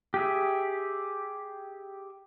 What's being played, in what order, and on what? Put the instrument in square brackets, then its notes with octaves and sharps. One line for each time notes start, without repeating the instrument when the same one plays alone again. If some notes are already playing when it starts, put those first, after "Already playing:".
[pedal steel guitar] G4 G#4 E5